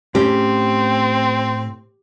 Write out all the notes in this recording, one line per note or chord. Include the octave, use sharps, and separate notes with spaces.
A2 C4 C#4 G4